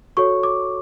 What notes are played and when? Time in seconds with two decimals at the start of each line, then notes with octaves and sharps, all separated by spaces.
0.17 F#4 A4 C#5 C#6
0.43 D6